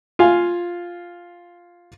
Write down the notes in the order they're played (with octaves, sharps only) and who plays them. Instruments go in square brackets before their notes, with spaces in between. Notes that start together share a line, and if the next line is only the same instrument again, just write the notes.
[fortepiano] F4 F5 G#5